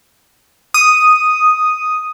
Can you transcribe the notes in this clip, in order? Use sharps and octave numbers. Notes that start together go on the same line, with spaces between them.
D#6